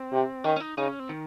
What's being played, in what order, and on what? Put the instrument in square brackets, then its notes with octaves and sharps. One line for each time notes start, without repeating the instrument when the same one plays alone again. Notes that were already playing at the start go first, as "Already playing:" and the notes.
Already playing: [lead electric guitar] C4
[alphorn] C3
[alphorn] D#3 [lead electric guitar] C#4
[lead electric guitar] C#4
D#4
[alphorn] C#3 [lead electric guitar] D#4
[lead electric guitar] C#4
C4
D#3